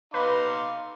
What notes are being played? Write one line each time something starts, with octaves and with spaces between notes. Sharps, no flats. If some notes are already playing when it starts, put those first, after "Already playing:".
D#4 B4 F5 C6 D6